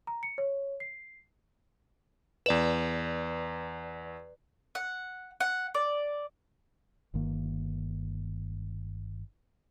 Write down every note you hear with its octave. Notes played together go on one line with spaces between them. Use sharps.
A#5
C#7
C#5
C7
E2 B4 D5 E7
F#5
F#5
D5
G1 G2 D#3 A#3